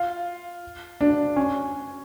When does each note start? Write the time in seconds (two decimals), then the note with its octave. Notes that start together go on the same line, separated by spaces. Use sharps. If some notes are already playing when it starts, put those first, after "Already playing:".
Already playing: F4
1.01 D4
1.36 C#4